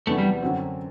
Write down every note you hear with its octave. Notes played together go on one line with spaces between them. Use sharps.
E2 C3 F#3 A3 B3 D4
G3
F#2 D3 F#3 C4 F#4